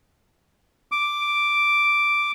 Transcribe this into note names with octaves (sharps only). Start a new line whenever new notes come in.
D6